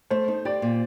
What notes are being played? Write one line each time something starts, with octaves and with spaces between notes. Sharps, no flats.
A3 C5
D#4
G4 D5
A#2